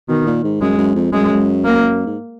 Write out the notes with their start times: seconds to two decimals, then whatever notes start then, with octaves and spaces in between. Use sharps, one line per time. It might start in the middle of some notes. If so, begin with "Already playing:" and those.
0.08 B2 D#3
0.26 A#2
0.44 G#2
0.61 F#2 G#3
0.78 F#2
0.95 F2
1.12 F#2 G#3
1.64 A#3
2.06 G#2